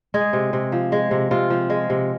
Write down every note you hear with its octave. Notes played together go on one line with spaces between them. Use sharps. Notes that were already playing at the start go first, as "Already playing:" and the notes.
G#3 G#4
C3
C3
F3
G#3
C3
C3 F4
F3
G#3
C3